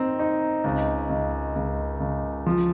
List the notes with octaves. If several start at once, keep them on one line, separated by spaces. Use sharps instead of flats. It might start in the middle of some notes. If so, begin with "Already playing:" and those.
Already playing: C4 D#4
D#4
C#2
C#2
C#2
C#2
F3